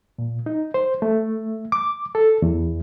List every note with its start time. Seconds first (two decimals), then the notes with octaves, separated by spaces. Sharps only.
0.19 A#2
0.46 D#4
0.74 C5
1.02 A3
1.72 D6
2.15 A4
2.42 E2